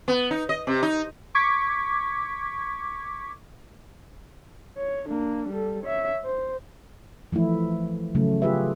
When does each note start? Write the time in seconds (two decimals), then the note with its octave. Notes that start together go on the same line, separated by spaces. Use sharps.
0.08 B3
0.31 D#4
0.49 D#5
0.67 C3
0.82 D#4
1.35 C#6 D6 G#6 B6
4.77 C#5
5.08 A#3 D4
5.49 G3 A4
5.84 C#5 E5
6.24 C5
7.32 E3 F3 A3 E4
8.15 C#3 F#3 A3
8.42 F4 G4 G#4 B4 E5